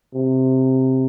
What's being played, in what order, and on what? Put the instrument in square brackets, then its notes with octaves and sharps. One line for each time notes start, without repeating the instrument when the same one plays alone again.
[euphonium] C3